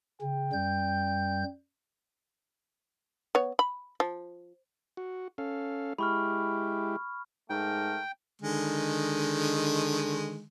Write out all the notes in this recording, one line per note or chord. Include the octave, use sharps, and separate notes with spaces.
C#3 G5
F#2 G3 G6
B3 C#5
B5
F3
F#4
C#4 A4 F5
G#3 E4 G4 B5 C#6 F6
G#2 A3 A#4 G5
D3 D#3 G#3